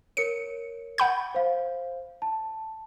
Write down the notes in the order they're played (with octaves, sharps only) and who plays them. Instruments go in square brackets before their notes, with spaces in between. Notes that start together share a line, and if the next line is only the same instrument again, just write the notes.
[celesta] A#4 C#5 [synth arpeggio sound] C#7
[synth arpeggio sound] F#5 B5 G6
[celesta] C5 F5
A5